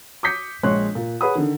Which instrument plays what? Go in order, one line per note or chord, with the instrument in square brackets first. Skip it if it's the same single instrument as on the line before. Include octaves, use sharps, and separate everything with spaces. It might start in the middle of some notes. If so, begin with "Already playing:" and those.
[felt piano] D6 D#6 G6 B6 C#7
A#1 G#3 C#5 C6 F#6
A#2
G#4 B4 C#5 F#5 B5 D#6
D3 D#3